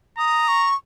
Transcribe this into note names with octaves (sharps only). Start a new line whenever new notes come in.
A#5 D#6
C#6